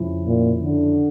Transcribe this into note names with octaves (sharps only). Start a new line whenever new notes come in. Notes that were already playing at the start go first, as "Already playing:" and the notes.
Already playing: F2 C#3 F3 C#4 E4
A#2
D3